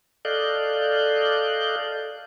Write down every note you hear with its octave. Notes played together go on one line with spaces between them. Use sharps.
A4 D5 D#5 F5 F#6 G6